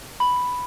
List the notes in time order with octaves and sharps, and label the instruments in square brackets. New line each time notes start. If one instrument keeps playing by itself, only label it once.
[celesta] B5